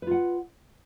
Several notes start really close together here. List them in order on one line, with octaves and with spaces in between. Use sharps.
B4 F4 F#5